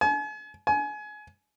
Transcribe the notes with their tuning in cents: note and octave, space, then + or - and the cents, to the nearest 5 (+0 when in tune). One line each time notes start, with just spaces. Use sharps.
G#5 +40
G#5 +25